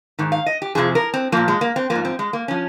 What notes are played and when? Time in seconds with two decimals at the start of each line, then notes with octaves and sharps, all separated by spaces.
0.19 G#2 D#3
0.32 F5
0.46 D#5
0.62 G4
0.75 F2 C3 F3 G#4
0.95 A#4
1.14 C4
1.32 A#2 F3 A#3
1.48 G#3
1.61 A#3
1.76 C4
1.90 F3 A#3
1.95 G#2
2.05 C4
2.19 G#3
2.33 A#3
2.48 F3 C#4